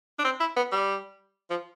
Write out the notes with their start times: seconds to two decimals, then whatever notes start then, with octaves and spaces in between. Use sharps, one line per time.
0.19 D4
0.24 C4
0.40 E4
0.56 B3
0.72 G3
1.50 F3